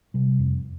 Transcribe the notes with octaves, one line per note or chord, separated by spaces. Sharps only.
C3 G3
F2